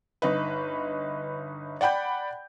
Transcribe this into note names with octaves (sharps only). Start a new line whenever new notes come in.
G1 D#4 B4
D5 F#5 G5 B5 G6